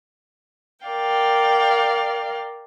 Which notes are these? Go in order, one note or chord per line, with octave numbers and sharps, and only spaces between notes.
A#4 D5 F5 G5